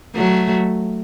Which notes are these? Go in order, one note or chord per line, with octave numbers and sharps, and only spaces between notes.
F#3 A3